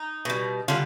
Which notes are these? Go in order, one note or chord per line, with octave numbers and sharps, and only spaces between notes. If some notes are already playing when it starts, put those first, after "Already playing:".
Already playing: D#4
B2 G3
D3 G3 F4